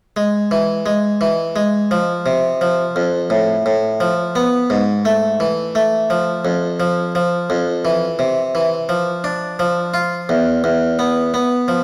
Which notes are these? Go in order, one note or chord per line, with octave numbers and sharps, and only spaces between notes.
G#3
E3
G#3
E3
G#3
F3
C3
F3
F2
A2
A2
F3
B3
G#2
A3
E3
A3
F3
F2
F3
F3
F2
E3
C3
E3
F3
D4
F3
F4
E2
E2
B3
B3
F3